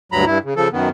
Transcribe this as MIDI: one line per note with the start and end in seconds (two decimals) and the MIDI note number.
0.12 0.25 38
0.12 0.25 43
0.12 0.25 54
0.12 0.25 82
0.12 0.25 83
0.26 0.38 43
0.26 0.38 64
0.44 0.54 49
0.56 0.68 49
0.56 0.68 53
0.56 0.68 69
0.73 0.89 42
0.73 0.89 51
0.73 0.89 59